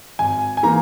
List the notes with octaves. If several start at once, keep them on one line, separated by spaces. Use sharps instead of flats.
G#1 G#5
G#5
E3 A#3 D#4 A#5